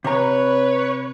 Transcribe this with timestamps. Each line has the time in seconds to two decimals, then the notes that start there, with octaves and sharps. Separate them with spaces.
0.04 C3 B4 C#5 A#5